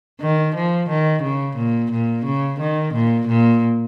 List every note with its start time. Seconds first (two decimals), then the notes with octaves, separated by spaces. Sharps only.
0.21 D#3
0.55 F3
0.89 D#3
1.22 C#3
1.57 A#2
1.92 A#2
2.25 C#3
2.60 D#3
2.94 A#2
3.28 A#2